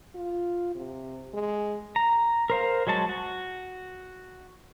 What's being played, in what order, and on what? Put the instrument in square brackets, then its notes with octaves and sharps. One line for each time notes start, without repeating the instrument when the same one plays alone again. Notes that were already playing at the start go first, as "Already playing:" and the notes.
[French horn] F4
C3
G#3
[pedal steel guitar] A#5
A#4 C5 F5
F#3 G#3 F#4 A5
F#4